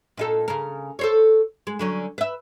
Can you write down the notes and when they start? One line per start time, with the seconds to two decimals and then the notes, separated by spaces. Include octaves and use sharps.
0.17 A#2 D#4 A4
0.48 C#3 A#4
0.99 A4 C5 C#5
1.67 G#3
1.79 D3 F#3 C#4
2.18 B4 E5